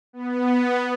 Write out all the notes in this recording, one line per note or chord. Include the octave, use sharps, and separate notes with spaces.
B3